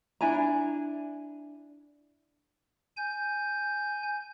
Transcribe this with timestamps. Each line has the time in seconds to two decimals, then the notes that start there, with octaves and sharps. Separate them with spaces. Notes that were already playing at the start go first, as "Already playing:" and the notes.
0.21 D4 E4 G#5 A#5
2.97 G#5 G6